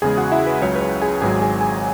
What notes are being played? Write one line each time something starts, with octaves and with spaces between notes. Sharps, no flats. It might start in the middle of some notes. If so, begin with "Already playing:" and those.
E2 C#3 G#3 G#4 G#5
F#4 F#5
E4 E5
B4
C#2 C#3 F#3 C#5
B4
C#5
G#4 G#5
G#1 G#2 F#3 G#4 G#5
G#4 G#5
G#4 G#5